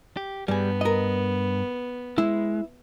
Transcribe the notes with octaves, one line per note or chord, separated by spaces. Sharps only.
G4
G2 G3 B3 G#4
A#4 D#5
G#3 E4